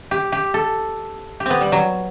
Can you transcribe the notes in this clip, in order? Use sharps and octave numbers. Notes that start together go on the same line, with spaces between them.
G4
G4
A4
G4
B3 C4
G3
F#3